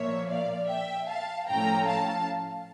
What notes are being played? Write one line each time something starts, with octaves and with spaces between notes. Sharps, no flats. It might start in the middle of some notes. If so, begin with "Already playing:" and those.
Already playing: A#2 F3 A#3 C#5 E5
D5 F5
E5 G5
F5 A5
A2 F3 A3 C#4 G5 A#5
F5 A5